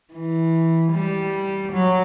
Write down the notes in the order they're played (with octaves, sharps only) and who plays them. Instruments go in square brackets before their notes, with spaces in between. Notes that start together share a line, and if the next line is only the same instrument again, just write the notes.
[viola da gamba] E3
G3
F#3